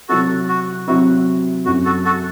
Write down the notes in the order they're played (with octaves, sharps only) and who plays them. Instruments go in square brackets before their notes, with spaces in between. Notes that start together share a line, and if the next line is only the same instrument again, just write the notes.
[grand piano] C3 F#3 C4 E4 [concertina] F#4 A4
[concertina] F#4
[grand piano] C3 F#3 C4 E4 [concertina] F#4
[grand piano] F#2 F#3 A3 C4 E4 [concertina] F#4
[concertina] F#4 A4
F#4 A4